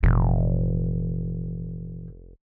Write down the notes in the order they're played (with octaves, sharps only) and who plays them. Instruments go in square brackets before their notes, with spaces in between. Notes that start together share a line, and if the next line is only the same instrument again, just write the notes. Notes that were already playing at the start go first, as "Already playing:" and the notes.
[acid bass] F1 [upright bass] A#2 E3